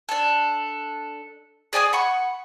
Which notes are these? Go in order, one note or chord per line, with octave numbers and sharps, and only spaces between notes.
D4 A4
G#4 D5 G#5 D#6
F#5 B5 C#6